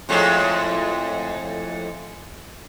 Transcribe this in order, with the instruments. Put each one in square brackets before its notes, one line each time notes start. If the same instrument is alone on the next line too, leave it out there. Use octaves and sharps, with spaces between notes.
[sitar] F2 A2 G#3